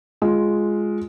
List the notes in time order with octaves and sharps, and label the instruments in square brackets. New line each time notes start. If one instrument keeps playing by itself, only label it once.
[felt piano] G#3 F4